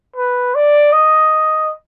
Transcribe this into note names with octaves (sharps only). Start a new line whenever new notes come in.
B4
D5
D#5